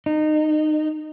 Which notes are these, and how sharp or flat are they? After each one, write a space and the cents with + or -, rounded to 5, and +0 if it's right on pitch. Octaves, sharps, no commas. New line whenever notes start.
D#4 -25